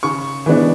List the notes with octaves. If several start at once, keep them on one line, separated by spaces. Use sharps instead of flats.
C#3 C#6
E3 G#3 B3 D4